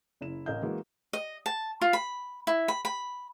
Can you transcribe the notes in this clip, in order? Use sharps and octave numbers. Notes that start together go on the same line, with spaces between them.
F#1 E4 E7
A1 A#4 D#5 F5 G6
E3 G#3 A#3 F#4
D#5
A5
F4
B5
E4
B5
B5